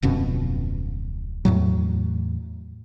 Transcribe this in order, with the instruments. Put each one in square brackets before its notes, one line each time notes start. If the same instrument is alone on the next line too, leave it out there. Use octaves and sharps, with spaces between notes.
[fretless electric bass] D1 F2 B2 C#4
E2 A2 F#3